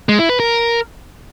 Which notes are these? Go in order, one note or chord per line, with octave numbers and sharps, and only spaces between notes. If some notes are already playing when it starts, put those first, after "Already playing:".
G#3
E4
B4
A#4